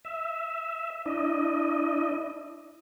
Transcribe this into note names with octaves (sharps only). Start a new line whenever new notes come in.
E5
D4 E4 D#5